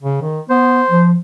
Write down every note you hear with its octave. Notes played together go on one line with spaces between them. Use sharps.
C#3
D#3
B3 C5
F3